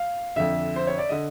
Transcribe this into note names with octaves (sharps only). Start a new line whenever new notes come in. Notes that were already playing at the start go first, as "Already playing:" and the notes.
Already playing: F5
F2 D3 E5
C5
C#5
D5
D3 D#5